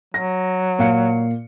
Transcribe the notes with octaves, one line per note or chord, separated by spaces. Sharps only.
F#3 A#6
A#2 F5 C#7